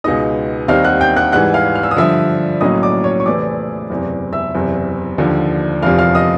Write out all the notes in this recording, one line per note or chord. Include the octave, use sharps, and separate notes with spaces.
C#2 B2 G#3 B3 D#4 D#5 D#6
D#2 D#3 G3 C4 D#4 F5 F6
F#5 F#6
G5 G6
F#5 F#6
G#2 E3 G3 F#5 F#6
F5 F6
F6
E6
D#6
G2 D3 F3 E5 E6
B1 A2 F#3 A#3 C#4 D#5 D#6
D5 D6
C#5 C#6
C#6
E2 C3 E3 A3 C4 D5 D6
F#1 E2 C3
E5 E6
F#1 E2 C3
D#2 D3 F3
F1 E2 C3 F3 F5 F6
F5 F6
D#5 D#6